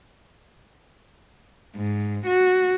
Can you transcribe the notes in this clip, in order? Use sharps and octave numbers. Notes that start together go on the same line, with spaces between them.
G#2
F#4